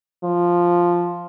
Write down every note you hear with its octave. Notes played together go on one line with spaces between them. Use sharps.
F3